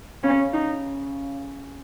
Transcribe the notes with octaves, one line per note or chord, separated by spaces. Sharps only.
C#3 C#4
D#4